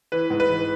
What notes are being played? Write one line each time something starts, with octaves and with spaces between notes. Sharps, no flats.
E3 B4
G#2
B4
E3